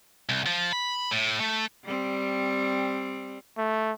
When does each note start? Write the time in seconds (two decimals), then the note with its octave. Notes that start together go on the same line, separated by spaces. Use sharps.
0.29 C2
0.46 F3
0.73 B5
1.11 A2
1.40 A3
1.85 G3 C4
3.57 A3